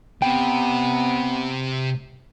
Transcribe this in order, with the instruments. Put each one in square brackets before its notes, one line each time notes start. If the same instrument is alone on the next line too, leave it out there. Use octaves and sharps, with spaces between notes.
[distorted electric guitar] C3 [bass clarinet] B3 [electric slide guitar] G5